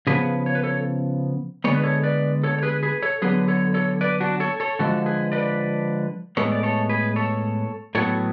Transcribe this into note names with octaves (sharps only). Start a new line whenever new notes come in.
C#3 F3 B3 G#4 B4
C#5
B4
A4 C#5
D3 G#3 B3 C#5
B4
A4 C#5
B4 D5
A4 C#5
C#5
G#4 B4
G#4 B4
A4 C#5
D3 F#3 B3 G#4 B4
A4 C#5
A4 C#5
B4 D5
D4 F#4
A4 C#5
A4 C#5
D3 F3 G#3 F#4 A4
G#4 B4
B4 D5
A2 G#3 B3 A4 C#5
D5
A4 C#5
G#4 B4
A4 C#5
A2 F#3 B3 A4 C#5